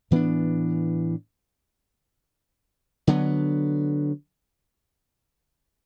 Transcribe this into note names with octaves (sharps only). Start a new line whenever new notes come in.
A2 E3 B3 D4
D3 F#3 B3